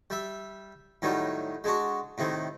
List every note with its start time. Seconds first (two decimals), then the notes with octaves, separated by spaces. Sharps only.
0.10 G3 E5
1.02 A2 D#3 F#3 G3
1.64 G#3 D4 F#4
2.18 A2 C3 D#3